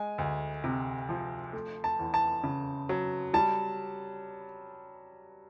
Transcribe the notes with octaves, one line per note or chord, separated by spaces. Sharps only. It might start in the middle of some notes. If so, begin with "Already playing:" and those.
Already playing: G#3 G#5
D2
C3
F3
A3
A5
E2
A5
C#3
F#3
G3 A5